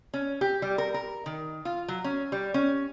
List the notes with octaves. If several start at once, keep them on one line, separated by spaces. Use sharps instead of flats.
C#4
G4
G3
A#4
A#4
D#3
F4
F#3
C#4
G3
C#4